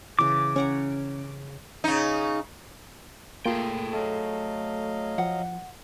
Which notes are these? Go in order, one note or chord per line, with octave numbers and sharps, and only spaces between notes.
C#3 E3 D6
C#4 C#5 F#5 A#5
C#3 D#4
A3 A#3 F4 G#4 G5
F#3 A4 D#5 F5
F3 F#5